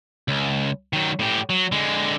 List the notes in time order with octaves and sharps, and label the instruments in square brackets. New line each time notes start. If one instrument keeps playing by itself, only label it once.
[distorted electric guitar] C#2
D#3 F#3
A2 G4
F#3
D3 G#3